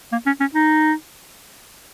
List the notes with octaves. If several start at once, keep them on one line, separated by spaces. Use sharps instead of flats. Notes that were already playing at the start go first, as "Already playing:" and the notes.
A#3
C#4
C#4
D#4